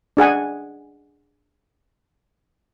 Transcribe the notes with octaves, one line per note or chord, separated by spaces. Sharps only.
D4 G#4 F#5 G#5